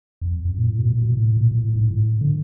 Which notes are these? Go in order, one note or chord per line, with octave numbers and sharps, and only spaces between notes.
F2
F#2
A#2
A2
B2
B2
A#2
A2
A#2
A#2
A2
G#2
A2
D3